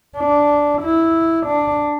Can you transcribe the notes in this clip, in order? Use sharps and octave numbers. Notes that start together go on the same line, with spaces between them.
D4
E4
D4